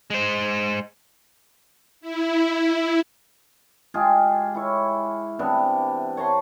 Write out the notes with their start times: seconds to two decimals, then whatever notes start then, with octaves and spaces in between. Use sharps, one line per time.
0.10 G#3 C5
2.01 E4
3.94 G#3 F4 G4 G#4
4.55 E4 C#5
5.39 C3 E3 B3 D4
6.17 C#5 A5 A#5 C6